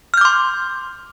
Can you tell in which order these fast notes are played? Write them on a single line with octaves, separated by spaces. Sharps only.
F6 G6 D6 C6